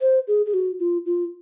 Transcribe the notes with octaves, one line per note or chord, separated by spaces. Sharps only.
C5
G#4
G#4
F#4
F4
F4